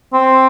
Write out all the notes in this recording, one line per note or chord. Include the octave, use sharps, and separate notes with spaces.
C4